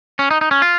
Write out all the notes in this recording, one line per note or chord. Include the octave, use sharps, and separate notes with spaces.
C#4
D#4
D#4
C#4
F4